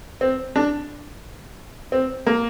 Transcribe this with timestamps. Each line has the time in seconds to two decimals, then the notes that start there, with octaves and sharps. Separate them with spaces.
0.21 C4
0.56 D4
1.92 C4
2.27 A#3